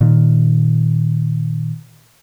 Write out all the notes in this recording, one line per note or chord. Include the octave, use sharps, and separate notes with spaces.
A#2 D#3